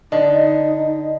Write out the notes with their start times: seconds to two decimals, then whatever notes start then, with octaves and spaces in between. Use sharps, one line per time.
0.12 D3 D#4 D#5